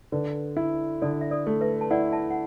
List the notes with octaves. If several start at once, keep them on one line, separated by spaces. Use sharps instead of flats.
D3 B4
E4
D3 A4 D5
E5
A4 D5
A3
B4 E5
A5
E4 D5 F#5
E5 A5
F#5